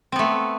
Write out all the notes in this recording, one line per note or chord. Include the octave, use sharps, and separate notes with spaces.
A3 B3 C4